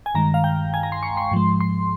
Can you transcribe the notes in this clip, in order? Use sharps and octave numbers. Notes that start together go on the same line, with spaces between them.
G#5
G2 D#3 G#3 A#5
F5
G5
G#5
A#5
C6
C#6
C6
G#2 F3 G#3
C6